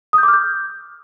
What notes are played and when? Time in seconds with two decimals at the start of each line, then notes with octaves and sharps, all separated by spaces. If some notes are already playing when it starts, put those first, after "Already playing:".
0.13 D#6
0.18 G6
0.23 D6
0.28 F6
0.33 G6